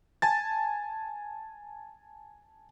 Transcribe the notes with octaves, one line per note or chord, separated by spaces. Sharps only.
G#5 A5 A6